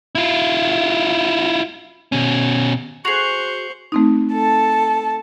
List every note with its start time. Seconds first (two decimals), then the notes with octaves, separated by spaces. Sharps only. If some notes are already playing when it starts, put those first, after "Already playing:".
0.15 E4 F4
2.12 B2 C#4
3.05 F#4 G#4 C5 C#6 C7 F7 F#7
3.92 A3 C4 D#4
4.32 A4 A5